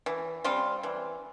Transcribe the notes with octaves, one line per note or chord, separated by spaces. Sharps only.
E3
G3 C4 F4
E3